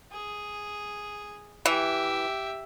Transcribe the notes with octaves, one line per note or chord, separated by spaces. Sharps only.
G#4
E3 G4 E5